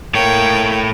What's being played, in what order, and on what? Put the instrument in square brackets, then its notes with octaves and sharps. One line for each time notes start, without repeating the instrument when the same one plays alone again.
[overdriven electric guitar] A2 C#5 [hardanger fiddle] A#3 G5